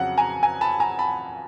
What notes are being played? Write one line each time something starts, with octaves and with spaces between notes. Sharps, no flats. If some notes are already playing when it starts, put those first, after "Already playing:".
Already playing: F2 C#3 F#3 F#5
G#5 A#5
G#5 A#5
A5 B5
G#5 A#5
A5 B5